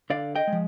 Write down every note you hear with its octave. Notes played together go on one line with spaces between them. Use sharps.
D3 D5 F5
D#5 G5
G#3
F3